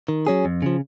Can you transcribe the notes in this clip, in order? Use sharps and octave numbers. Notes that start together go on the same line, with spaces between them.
D#3
F#3 C#4 G#4
F2
C#3 F3